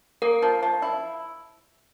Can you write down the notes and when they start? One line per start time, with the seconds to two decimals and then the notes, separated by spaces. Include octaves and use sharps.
0.22 A#3 A#4
0.42 F3
0.63 F3
0.82 E4